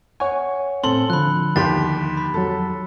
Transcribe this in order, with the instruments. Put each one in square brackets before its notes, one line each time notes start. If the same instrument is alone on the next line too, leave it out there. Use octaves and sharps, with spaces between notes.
[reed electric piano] C#5 F#5 G#5 [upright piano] C#6
[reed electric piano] A2 C4 [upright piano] A4 F#7 [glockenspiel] C6
[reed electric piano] D3 F3 [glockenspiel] B5 F#6
[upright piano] D#2 G4 C6 [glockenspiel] A6 B6
[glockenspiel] B5
[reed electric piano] F2 F#3 [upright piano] A4